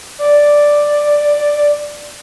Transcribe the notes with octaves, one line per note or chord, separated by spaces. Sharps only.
D5